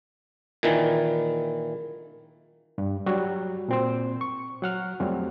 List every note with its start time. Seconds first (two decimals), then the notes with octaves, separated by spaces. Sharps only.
0.63 A#2 D#3 E3
2.78 G2
3.06 F#3 G3 F#4
3.69 A#2 C4 C5
4.21 C#6
4.62 F#3 F#5 F6
5.00 F2 F#3 G3 A3 C4